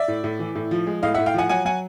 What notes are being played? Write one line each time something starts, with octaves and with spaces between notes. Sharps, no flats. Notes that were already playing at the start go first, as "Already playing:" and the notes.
Already playing: D5 E5
A2
A2
E3
A2
F3
G#3
A2 D#5 F5
E5 F#5
A2
F5 G5
F3 F#5 G#5
F#3 F#5 G#5
F#3 F#5 G#5